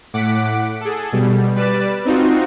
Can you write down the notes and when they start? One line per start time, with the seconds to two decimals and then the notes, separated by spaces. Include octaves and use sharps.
0.14 A2 F#5 D6 B6 D7
0.81 G#4 A4
1.12 B2 G3
1.55 G3 B4 D5 A6 E7
2.05 C4 D#4 F4 F#4